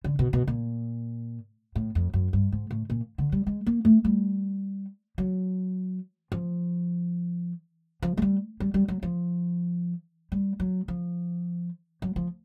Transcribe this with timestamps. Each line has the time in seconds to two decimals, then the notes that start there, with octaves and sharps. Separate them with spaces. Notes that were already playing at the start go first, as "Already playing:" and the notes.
0.04 D3
0.19 B2
0.33 B2
0.47 A#2
1.76 A2
1.95 F2
2.14 F#2
2.33 G2
2.52 G#2
2.71 A2
2.90 A#2
3.18 D3
3.32 G3
3.47 G#3
3.66 A#3
3.85 A3
4.05 G3
5.18 F#3
6.32 F3
8.03 F3
8.17 G#3
8.22 G3
8.60 G3
8.74 G3
8.88 F#3
9.03 F3
10.32 G3
10.60 F#3
10.88 F3
12.02 F#3
12.16 F3